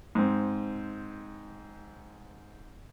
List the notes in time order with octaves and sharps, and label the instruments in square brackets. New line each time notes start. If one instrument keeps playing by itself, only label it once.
[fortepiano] G#2 C4